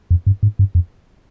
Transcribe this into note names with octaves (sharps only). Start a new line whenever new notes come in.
F2
G2
G#2
G2
F2